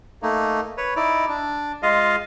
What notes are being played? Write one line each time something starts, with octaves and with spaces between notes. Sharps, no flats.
A3 A#3 D#4
B4 C#5
D#4 E4 D5
D4
G#3 F4 D#5 F5